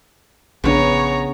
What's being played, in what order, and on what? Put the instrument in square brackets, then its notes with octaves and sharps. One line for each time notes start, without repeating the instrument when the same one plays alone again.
[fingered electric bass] A#1 D4 [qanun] C#3 B3 [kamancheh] C#5 A#5